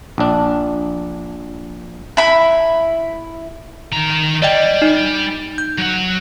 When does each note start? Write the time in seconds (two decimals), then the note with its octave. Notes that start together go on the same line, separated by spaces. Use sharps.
0.18 A#1 D4
2.17 E4 B5
3.93 D#3 A#5
4.42 G3 D5 D#5 G5
4.82 D#4
5.58 G6
5.78 F#3 F#5